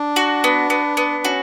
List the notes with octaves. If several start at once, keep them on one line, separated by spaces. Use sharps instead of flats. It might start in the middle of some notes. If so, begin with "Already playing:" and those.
Already playing: D4
F#4
B3
B3
B3
C#4 F#4